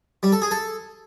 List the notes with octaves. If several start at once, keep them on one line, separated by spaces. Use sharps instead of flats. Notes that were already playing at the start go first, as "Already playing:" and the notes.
G3
A4
G#4
A4